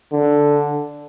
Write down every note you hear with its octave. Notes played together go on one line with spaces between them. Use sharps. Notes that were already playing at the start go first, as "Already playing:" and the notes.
D3